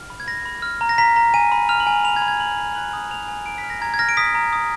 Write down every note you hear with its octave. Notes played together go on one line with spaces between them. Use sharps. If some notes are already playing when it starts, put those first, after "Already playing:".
Already playing: F6
B5
G#6
B5 A#6
B5
F6
A#5
A#6
A#5 B6
A#5
G#5 D#7
B5
F6 F7
F#7
G#5
F7
B5 F7
G#6
B5
G#6
B5 F#7
B5
F#6 F#7
D#6
D#6 F7
G#5
A#5 D7
B6
F6
A#6
A#5 G#6
G#6
F6 A#6
D7
D#6 B6
A#5
D#6